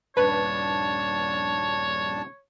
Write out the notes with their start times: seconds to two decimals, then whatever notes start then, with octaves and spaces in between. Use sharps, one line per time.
0.17 D#1 G2 D4 B4 C#5 A5